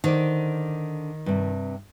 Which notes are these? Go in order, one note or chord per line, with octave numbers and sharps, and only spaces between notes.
D3 D#3 C5 D5
G2 C3